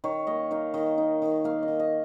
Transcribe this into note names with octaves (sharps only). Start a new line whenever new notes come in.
D#3 C#5
A#3 D#5
D#4 F5
D#3 D#5
D#4
D#3
A#3 F5
D#3 D#5
D#5